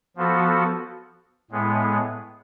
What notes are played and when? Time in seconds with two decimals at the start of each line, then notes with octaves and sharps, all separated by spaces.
0.17 F3 B3 F#4 A4
1.51 A2 G#3 B3